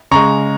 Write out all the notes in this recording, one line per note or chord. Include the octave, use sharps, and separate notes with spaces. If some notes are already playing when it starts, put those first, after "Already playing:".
C#3 G#3 A#5 C#6